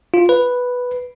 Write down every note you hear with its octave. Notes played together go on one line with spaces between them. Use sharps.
F4
B4